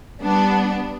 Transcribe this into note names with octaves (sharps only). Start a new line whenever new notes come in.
G3 B3 D4